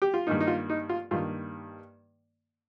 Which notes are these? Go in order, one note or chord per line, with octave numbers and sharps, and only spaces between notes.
G4
F4
G2 D#3 A#3 D#4
D#4
F4
D#4
F4
G2 D#3 A#3 F4